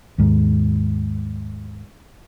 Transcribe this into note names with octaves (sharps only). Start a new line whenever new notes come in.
D#2 G#2